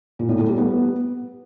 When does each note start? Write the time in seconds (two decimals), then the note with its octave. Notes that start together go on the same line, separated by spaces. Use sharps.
0.19 A#2
0.29 A2
0.38 A3
0.48 G3
0.58 B3